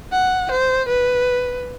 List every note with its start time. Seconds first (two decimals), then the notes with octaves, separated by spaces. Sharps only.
0.13 F#5
0.51 C5
0.88 B4